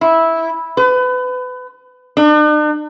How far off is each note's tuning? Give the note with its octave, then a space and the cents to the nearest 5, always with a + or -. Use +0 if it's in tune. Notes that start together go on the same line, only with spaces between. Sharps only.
E4 -10
B4 +30
D4 +45